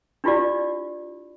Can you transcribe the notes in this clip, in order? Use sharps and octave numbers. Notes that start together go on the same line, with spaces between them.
D4 E4 F4 G4 D5